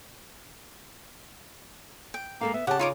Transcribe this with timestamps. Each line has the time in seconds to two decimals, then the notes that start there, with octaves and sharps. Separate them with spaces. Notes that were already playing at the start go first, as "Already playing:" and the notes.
2.14 G5
2.41 G#3 A#3 A4 F5
2.54 B3 E5
2.67 C#3 G4 F#5 A5
2.79 D#4 F4 C#5 D6